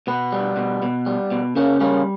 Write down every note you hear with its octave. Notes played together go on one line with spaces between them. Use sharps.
B2 B3
G3
B2
B2
G3
B2
C#3 A#3 C#4
G3 A#3 C#4